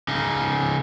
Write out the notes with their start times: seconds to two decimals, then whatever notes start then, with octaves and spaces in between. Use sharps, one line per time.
0.08 C#3 D#4